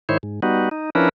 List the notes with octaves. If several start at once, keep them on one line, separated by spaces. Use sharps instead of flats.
G#2 D#3 E4 C5 C#5
G#2
G3 B3 D#4 F#4
D#4
F3 C#4 D4 E4 A#4 B4